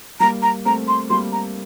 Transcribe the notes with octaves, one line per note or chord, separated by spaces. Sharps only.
G3 A#3 A#5
A#5
A3 C4 A#5
C6
G3 A#3 C6
A#5